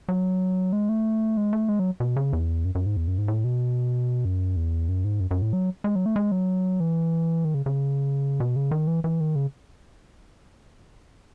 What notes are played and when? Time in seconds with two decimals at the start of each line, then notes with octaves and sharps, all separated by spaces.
0.09 F#3
0.73 G#3
0.89 A3
1.37 G#3
1.53 A3
1.68 G#3
1.79 F#3
2.00 B2
2.16 C#3
2.33 E2
2.65 F#2
2.75 F#2
2.86 G#2
2.97 E2
3.08 F#2
3.18 G#2
3.28 A2
3.44 B2
4.25 F#2
4.56 E2
4.89 F#2
5.04 G#2
5.20 F#2
5.31 F#2
5.42 A2
5.53 F#3
5.84 G#3
5.96 F#3
6.06 A3
6.16 G#3
6.32 F#3
6.80 E3
7.45 D#3
7.54 C#3
7.66 C#3
8.40 B2
8.56 C#3
8.71 D#3
8.87 E3
9.04 E3
9.20 D#3
9.35 C#3